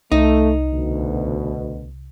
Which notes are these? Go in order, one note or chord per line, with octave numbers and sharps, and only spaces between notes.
C2 A3 D#4
D2 B2